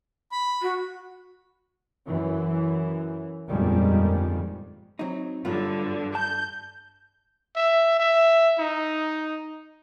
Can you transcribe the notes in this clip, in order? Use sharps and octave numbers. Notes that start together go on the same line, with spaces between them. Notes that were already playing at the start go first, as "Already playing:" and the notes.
B5
F#4
F#2 E3
G1 F2 A#2 D#3 G3 G#3
F#3 C4 D#4
G2 D3 F#3 B3 F4
A5 G6
E5
E5
D#4